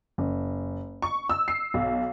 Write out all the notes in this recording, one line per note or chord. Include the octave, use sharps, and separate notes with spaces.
F#1
C#6
E6
C7
B1